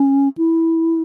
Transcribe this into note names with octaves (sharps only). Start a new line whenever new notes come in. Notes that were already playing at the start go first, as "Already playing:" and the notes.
Already playing: C#4
E4